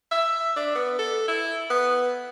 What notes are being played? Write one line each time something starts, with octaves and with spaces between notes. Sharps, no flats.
E5
D4
B3
A4
E4
B3